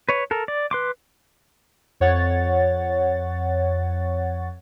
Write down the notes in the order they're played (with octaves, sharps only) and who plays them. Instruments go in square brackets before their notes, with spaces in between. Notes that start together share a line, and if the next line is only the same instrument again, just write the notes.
[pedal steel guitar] B4 C#5
A4 A#4
D5
B4 C6 D6
[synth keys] F2 C#5 F#5 A6